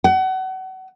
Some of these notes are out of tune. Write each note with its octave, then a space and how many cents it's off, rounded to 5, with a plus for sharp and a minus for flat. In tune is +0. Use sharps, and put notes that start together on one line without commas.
F#5 +30